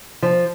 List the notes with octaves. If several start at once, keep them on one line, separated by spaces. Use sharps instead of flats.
F3